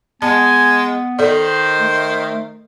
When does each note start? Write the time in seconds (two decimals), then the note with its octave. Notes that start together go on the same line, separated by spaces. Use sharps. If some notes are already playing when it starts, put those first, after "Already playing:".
0.22 G#3 B3 G#5 A5
1.19 D#3 A4 C5 D5
1.79 A3